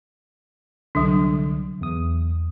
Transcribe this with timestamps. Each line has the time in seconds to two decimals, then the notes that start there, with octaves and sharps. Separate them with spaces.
0.95 C2 D3 F#3 D4
1.81 E2 D#6